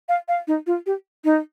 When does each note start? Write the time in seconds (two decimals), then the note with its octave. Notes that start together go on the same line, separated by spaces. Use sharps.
0.09 F5
0.28 F5
0.48 D#4
0.67 F4
0.86 G4
1.24 D#4